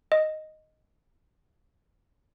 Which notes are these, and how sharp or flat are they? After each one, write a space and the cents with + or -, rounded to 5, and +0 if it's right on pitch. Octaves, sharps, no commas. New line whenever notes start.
D#5 +0